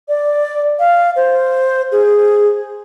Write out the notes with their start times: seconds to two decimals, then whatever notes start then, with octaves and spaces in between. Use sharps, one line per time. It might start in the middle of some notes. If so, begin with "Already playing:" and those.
0.08 D5
0.79 F5
1.16 C5
1.92 G#4